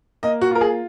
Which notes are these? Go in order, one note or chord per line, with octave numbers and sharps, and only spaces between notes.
A#3 D#5
F#4
F4 A#4
G#4